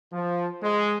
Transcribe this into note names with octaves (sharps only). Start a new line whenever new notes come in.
F3
G#3